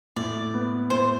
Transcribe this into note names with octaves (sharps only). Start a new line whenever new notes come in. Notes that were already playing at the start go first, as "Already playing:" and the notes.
A2 D5
B3
A2 C5